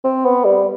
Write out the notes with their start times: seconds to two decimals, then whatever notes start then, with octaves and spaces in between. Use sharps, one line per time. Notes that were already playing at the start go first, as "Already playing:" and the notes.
0.04 C4
0.25 B3
0.45 G3